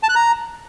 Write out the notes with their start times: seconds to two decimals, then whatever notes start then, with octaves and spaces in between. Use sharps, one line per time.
0.03 A5
0.09 F#6
0.15 A#5